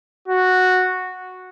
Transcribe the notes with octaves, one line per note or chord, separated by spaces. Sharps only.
F#4